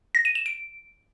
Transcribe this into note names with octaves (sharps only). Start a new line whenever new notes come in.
A#6
D#7
E7
D7